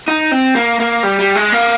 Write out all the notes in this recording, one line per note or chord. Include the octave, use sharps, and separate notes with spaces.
D#4
C4
A#3
A#3
G3
G3
G#3
A#3